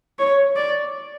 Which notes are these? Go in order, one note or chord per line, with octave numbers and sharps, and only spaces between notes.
C#5
D5